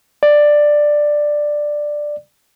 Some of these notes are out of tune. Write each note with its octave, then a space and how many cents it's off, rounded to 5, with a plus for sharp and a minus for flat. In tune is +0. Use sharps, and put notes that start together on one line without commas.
D5 +10